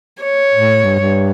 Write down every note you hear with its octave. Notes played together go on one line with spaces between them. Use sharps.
C#5
A2
G2
G2